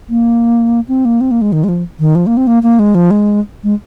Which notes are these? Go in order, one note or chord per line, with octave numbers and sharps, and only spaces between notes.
A#3
C4
A#3
C4
A#3
G#3
D#3
G#3
F3
D#3
F3
A#3
C4
A#3
A#3
G#3
F3
G#3
G#3